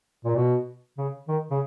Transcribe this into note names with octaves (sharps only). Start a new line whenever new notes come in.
A#2
B2
C#3
D#3
C#3